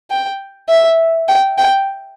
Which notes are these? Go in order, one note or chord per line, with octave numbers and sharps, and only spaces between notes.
G5
E5
G5
G5